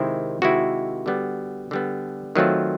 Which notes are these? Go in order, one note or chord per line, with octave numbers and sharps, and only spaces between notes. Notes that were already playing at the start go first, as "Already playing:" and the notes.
Already playing: C3 D#3 G#3 C4 E4
C3 D#3 G#3 C4 E4 F#4
D3 G3 B3
D3 G3 B3
D#3 F#3 A3 C4 F4